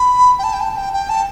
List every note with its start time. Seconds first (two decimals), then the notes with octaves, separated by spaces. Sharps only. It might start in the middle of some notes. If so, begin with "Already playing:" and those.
Already playing: B5
0.39 G5
0.44 A5
0.53 G5
0.61 A5
0.77 G5
0.93 G5
1.09 A5